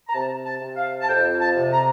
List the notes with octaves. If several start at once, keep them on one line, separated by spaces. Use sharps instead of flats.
A#5
C3 A5
A5
C3
F5
A5
F2 G5
A5
C3
A#5